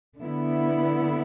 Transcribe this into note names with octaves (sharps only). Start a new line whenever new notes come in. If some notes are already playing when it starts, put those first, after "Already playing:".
D3 B3 E4